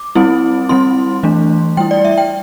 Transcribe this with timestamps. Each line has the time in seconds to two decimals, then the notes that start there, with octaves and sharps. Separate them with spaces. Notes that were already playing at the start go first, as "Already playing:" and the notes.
Already playing: D6
0.15 G3 C4 E4
0.69 G3 C4 E4 C6
1.23 E3 A3 D4
1.77 G3 E4 G5
1.91 D5
2.05 E5
2.18 G5